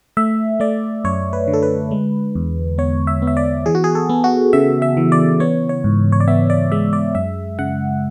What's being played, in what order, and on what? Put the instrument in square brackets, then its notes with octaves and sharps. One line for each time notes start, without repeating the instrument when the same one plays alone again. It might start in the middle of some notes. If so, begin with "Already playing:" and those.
[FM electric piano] A3 E5
A3 D5
F#2 C#5
B4
D3
A4
B4
G#3
E2
B3 C#5
E5
B3
E5
D5
E3 G#4
F#4
G#4
A4
B3
F#4
C#3 E5
E5
E3
D5
B3 C#5
C#5
G#2
C#5
D5
B3 E5
D5
G#3 E5
D5
F#2 E5
C#3 F#5